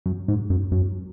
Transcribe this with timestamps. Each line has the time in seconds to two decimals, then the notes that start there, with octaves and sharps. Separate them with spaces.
0.06 F#2
0.28 G#2
0.50 F#2
0.72 F#2